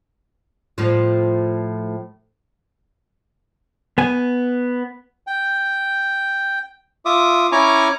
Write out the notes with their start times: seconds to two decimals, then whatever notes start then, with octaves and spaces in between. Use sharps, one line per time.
0.78 A2 F3
3.98 B3 G#5
5.27 G5
7.05 F4 E5 D6 D#6
7.52 C#4 E4 G#5 A#5 C#6 D6